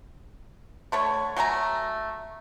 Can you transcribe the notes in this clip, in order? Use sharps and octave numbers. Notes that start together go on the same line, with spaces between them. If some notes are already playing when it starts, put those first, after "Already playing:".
D3 A3 C#5
F#3 A3 G#5 A#5